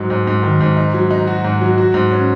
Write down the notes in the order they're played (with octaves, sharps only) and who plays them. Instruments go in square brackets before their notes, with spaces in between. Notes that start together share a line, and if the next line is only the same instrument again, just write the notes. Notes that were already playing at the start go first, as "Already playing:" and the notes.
Already playing: [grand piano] G#2 F#3
G#2
G#2
D#3
G#2
D#4
F#3
D#4
F#4
G#2
F#3
F#4
G#2
C#4